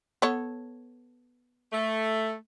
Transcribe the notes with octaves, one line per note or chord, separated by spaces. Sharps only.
B3 A4 C#5
A3